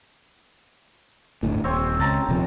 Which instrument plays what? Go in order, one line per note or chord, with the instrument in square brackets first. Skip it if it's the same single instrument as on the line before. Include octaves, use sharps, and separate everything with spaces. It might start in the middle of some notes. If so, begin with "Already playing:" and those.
[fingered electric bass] G1 D2 A2
[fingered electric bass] D#1 [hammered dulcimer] C4 C#5
[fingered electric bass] C#2 [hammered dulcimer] A5 A#5
[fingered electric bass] D#1 C3 F3